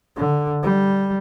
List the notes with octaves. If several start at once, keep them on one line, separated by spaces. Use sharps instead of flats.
D3
G3